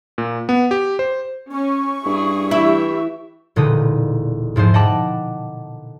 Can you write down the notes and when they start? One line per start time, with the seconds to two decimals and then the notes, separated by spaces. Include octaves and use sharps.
0.18 A#2
0.49 B3
0.71 G4
0.99 C5
1.51 C#4 C#6
2.06 G2 E4 G#4
2.51 E3 E4 G4 E5
3.56 E1 A#2 D3 D#4 B4 D#6
4.56 E2 G#2 F3 C5
4.74 D#5 F#5 G5 A5 B5 D6